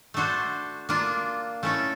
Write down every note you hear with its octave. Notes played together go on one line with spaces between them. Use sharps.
A3 D4 F#4 A4 C5
A#3 D4 F4
A3 C#4 E4 A4